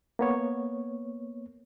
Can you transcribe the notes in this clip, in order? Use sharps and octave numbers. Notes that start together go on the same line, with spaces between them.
A#3 B3 C#5